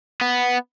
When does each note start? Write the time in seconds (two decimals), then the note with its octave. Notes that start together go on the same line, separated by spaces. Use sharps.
0.21 B3